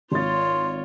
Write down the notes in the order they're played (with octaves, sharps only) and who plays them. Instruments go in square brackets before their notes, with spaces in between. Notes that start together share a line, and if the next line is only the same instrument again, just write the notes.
[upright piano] G#1 A6 [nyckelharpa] F4 C#5 [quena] C6